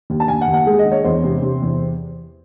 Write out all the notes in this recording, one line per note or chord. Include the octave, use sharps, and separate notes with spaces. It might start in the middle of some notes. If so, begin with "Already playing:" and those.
D#2
A5
D#2 G#5
F#5
D#2
F#5
G#3 G#4
D#5
G#3
C#5
E2 C5
C3
C3
E2